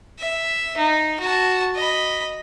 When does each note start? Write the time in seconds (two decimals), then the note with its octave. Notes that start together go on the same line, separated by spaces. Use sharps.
0.19 E5
0.77 D#4
1.20 F#4 A5
1.76 D#5 B5